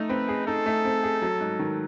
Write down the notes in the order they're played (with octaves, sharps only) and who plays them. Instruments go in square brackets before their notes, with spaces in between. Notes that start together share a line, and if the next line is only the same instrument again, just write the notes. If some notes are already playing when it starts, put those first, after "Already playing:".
Already playing: [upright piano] A3 D#4
[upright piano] C4 [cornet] B4
[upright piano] G#4
[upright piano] D#4 [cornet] A4
[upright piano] A3
C4
G#4
F#3
G#2
D#3